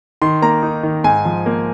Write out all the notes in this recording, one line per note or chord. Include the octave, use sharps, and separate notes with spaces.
D#3 C6
A#3 A#5
D#4
D#3
G#2 G#5
F3
A#3